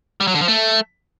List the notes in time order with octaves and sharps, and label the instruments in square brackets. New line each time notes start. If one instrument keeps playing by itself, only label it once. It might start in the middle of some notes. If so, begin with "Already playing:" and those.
[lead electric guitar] G3
F#3
D3
F3
A3